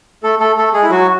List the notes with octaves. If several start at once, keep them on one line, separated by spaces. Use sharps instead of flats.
A3 A4
A3 A4
A3 A4
G#3 G#4
E4
F#3 F#4